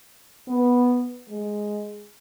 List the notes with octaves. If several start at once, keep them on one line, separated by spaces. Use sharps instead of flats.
B3
G#3